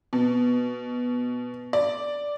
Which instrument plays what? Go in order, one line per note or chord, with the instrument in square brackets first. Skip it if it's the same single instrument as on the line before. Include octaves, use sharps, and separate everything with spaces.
[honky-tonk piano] B2
D5